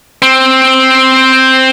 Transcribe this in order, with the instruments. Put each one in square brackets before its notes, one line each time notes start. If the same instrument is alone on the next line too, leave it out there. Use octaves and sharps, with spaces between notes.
[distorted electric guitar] C4